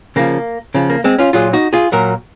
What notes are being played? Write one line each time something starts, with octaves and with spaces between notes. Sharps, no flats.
C#3 F3 A#3
C#3 F3
A#3
G#3 C4
C#4 F4
A#2 F#3 F4 G#4
D#4 F#4
F4 G#4
A#2 F#3 F#4 A#4